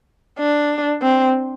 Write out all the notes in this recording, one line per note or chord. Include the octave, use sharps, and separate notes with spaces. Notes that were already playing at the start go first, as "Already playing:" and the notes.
D4
C4